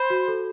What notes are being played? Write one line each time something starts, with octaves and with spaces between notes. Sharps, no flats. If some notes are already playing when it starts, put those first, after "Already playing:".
Already playing: C5 B5
F#4
A4